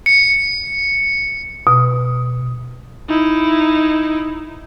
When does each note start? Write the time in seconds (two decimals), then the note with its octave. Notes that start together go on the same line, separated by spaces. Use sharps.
0.06 C#7
1.67 B2
3.09 D#4 E4